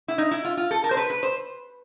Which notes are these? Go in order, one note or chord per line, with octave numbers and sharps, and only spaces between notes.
E4
D#4
E4
F4
F4
A4
A#4
C5
B4
B4
C5